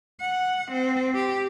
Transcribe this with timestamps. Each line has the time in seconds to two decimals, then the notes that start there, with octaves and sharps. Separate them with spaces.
0.20 F#5
0.71 C4
1.14 G4